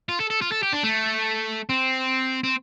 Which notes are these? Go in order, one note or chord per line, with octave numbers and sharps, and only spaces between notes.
F4
A4
A4
F4
A4
G4
D4
A3
C4
C4